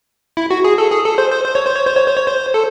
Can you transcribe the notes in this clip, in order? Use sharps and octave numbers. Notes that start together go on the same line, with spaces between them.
E4
F#4
G#4
A4
G#4
A4
C5
C5
C5
C#5
C5
C#5
C5
C#5
C5
C#5
C5
A4